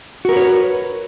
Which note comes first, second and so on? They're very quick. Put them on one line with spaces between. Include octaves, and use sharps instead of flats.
F#4 A#4 B4 C#5